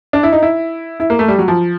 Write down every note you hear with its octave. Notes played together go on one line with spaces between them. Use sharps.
D4
E4
D#4
E4
E4
A#3
A3
G3
F#3
F3